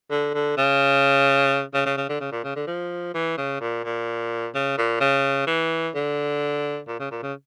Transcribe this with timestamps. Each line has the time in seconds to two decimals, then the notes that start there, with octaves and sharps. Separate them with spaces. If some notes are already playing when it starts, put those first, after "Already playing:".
0.10 D3
0.34 D3
0.57 C#3
1.74 C#3
1.86 C#3
1.97 C#3
2.09 D3
2.21 C#3
2.32 A#2
2.44 C#3
2.56 D3
2.67 F3
3.14 E3
3.37 C#3
3.61 A#2
3.84 A#2
4.55 C#3
4.78 A#2
5.01 C#3
5.47 E3
5.95 D3
6.87 A#2
7.00 C#3
7.11 A#2
7.23 C#3